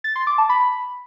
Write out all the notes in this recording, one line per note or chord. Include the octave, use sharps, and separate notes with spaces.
A6
C6
D6
A5
B5